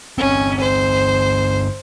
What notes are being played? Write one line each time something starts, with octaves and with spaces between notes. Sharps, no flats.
G1 C4 C#4
C5